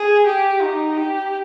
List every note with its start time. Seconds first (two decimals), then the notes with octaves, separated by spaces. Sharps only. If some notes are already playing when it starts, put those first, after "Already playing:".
Already playing: G#4
0.27 G4
0.62 D#4
0.97 G4